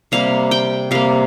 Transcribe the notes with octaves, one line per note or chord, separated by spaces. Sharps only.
C3 G3 A#3 F5
G5
C3 G3 A#3 F5